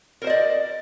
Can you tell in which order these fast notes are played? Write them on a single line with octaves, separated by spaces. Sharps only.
A#4 C5 D#5 D5